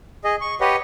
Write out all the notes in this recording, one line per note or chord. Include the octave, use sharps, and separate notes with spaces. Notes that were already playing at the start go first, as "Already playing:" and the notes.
G#4 D#5
C#6
G4 B4 C#5 D#5 F#5